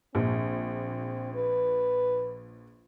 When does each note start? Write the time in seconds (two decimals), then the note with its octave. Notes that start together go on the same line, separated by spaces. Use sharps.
0.15 A#1 C4
1.35 B4